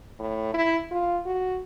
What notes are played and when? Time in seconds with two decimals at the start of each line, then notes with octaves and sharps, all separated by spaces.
0.19 A2
0.54 E4
0.91 F4
1.26 F#4